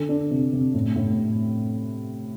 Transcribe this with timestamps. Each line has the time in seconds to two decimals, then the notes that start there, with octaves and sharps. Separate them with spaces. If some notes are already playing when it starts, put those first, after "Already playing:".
Already playing: D3 A4
0.09 D4
0.31 C3
0.53 C3
0.74 A2
0.96 A2